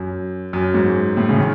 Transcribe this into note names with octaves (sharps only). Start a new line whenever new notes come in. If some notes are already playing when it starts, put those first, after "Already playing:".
Already playing: F#2
F#2
G#2
A2
C#3
D#3